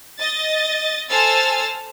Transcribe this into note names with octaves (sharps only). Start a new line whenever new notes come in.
D#5 A6
A4 C5 G#5 E6 F6 A6